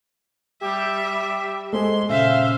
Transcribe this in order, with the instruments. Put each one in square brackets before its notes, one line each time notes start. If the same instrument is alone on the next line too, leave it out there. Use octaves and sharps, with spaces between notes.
[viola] G3 E5 [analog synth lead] G4
[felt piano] G#3 [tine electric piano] A4 C5 G#5 [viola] C6
[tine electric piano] A#2 [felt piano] C#3 [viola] C5 F5 [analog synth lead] E5